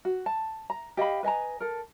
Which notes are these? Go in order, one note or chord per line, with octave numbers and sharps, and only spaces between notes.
F#4
A5
A#5
G4 D#5 F5 B5
B4 D#5 G#5 A#5
A4 A#4